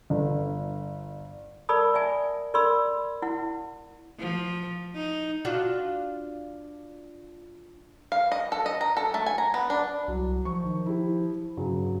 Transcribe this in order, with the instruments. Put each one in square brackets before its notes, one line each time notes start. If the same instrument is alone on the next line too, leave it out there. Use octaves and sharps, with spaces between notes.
[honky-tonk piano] G1
[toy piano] A#4 D5 A5 B5 D#6
D5 E5 G#5 A5
A#4 D5 B5 C6 E6
E4 F#5
[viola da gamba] F3
D#4
[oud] D4 F4 F#4
[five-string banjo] F5
D#5
A4
D#5
A#5
A4
A3
G#5
A#5
B3
D4
[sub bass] C2 [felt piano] F#3
[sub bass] F3 [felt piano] C#6
[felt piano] D#3
E4 G4
[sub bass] G2 [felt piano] C#3 F#3